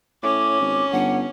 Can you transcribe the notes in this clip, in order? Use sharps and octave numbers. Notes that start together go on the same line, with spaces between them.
A2 C#4 D6
G#1
G1 F#5